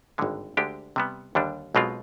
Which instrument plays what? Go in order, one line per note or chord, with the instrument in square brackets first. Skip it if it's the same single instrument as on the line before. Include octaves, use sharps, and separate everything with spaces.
[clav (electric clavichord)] G#1 G2 D3 G#3
D2 D3 G#3 D4 G4
C3 G3 B3
D#2 D3 G3 D4
B1 B2 G#3 C4 F4